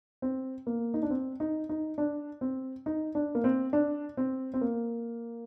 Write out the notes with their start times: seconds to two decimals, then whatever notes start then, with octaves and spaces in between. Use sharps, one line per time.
0.22 C4
0.67 A#3
0.94 D#4
1.02 D4
1.10 C4
1.40 D#4
1.69 D#4
1.98 D4
2.41 C4
2.86 D#4
3.15 D4
3.35 A#3
3.44 C4
3.73 D4
4.17 C4
4.54 C4
4.61 A#3